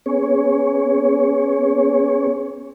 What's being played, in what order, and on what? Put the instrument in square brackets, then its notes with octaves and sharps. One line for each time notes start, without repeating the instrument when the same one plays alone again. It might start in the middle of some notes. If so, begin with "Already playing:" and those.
[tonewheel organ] B3 C#4 G#4 C#5